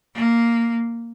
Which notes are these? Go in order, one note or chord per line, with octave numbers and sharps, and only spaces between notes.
A#3